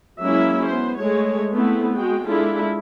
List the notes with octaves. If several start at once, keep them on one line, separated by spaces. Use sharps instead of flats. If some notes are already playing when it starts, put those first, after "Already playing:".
F#3 G#3 A#3 C#4 E4 E5
B3 C5
G#3 A3 C#5
A3 B3 C4 E4
G#3 F#4 G5
G#3 D4 E4 F4 A4